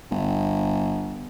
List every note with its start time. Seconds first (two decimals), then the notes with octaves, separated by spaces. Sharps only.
0.11 G1